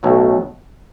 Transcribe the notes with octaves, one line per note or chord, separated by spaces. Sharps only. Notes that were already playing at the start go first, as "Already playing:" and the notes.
B1 A2 F#3